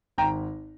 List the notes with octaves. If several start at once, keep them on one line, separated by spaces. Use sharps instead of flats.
G#1 G5 A#5